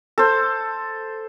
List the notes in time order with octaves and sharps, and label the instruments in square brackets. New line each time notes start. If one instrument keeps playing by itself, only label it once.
[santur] A4 C5